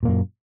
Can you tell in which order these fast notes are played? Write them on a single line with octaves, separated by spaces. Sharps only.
A#2 A#3 F#2